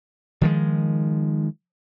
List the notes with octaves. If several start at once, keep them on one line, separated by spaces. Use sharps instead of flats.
D#3 F3 G#3